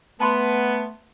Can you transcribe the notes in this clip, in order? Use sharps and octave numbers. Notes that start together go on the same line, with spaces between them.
A3 B3 A5 B5 C6